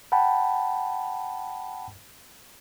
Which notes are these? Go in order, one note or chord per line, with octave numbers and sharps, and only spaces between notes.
F#5 G5 A5 B5